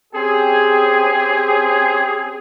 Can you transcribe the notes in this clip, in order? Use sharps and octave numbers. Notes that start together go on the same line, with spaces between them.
C4 C#4 G4 G#4